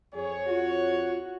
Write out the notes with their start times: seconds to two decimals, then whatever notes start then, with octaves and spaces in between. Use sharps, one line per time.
0.14 F2 G#4 C#5
0.50 F4 F#4